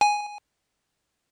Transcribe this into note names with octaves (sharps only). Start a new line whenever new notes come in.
G#5